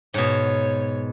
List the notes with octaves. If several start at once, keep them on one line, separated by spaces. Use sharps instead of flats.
G#2 B2 C#5